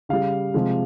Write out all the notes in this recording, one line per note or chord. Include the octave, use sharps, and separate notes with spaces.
C#3 G3 F5
C3 F3 G#3